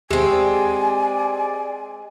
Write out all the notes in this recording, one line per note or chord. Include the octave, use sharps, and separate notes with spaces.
D#2 G#3 C4 G4 G#4 E5 G#5
D5